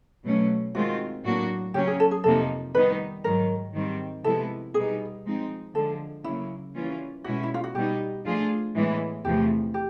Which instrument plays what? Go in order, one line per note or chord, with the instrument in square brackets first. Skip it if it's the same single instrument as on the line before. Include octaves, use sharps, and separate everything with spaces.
[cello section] B2 F#3 A3 C#4
[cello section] D#3 G#3 C4 F4 [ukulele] F#4
[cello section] A2 F#3 A#3 D4 F#4
[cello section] C#3 F#3 A#3 C#4 [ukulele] G4
[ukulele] G#4
A4
G#4
[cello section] F2 C3 F3 A#3 D#4 [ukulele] A4
[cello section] D#3 G3 B3 D#4 [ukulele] B4
[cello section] G#2 D#3 F#3 [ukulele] A#4
[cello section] G#2 D#3 G3 C4
[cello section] C3 F3 G#3 B3 E4 [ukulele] A4
[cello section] B2 G3 B3 D#4 [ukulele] G#4
[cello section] F3 G#3 C4 D#4
[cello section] D3 F3 G#3 [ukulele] A4
[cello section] C#3 F#3 A#3 [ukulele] E4
[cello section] E3 G3 A#3 C#4 F4
[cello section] B2 G#3 C#4 E4 [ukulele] F#4
[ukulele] E4
F4
F#4
[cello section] B2 G3 B3 D#4 [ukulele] G4
[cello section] F3 A3 D4 F4 G#4
A2 E3 G#3 B3 E4
[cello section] E2 C3 F3 A3 [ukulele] G4
[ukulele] G4